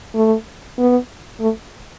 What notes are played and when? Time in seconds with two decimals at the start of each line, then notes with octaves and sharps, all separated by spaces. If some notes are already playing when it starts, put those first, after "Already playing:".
0.15 A3
0.78 B3
1.41 A3